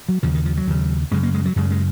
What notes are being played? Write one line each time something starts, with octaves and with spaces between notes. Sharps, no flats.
F#3
D#2 C#3 F3
D#3
F3
F#3
D#2 C#3
F#2 C#3 G#3
A#3
G#3
F#3
F#2 C#3 G#3
G#3